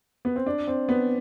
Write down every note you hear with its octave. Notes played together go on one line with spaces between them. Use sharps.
B3
C4
D4
C4
B3